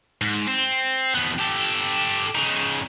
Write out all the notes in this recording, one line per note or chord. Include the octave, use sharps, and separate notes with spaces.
G#2
C4
D#2 B3
G4 A4
C#3 D#4